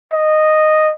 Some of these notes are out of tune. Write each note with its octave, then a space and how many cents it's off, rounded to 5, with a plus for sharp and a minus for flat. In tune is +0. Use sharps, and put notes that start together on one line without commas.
D#5 -10